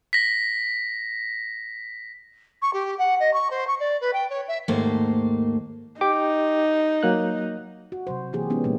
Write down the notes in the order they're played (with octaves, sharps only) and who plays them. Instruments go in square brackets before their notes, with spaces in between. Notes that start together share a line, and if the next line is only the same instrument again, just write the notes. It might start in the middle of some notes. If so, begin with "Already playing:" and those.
[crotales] A#6 B6
[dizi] C#6
G4
F#5
D#5
C#6
C5
C#6
D5
B4
G5
C#5
E5
[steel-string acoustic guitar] D#2 G#2 A3 A#3 C5
[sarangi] D#4 [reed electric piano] G4 G5 D6
[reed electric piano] F#3 A#3 F#6
[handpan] F#4
C3 F#3 C5
E3 A#3 G4 G#4
G#3 B3 C#4 D#4 G4
A#2 G3 G#3 A#3